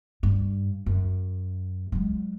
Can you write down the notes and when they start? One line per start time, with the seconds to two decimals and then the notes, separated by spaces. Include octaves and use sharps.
0.23 G2
0.86 F#2
1.92 F#3 G#3